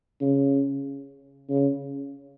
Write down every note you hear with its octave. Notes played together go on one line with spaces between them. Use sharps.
C#3
C#3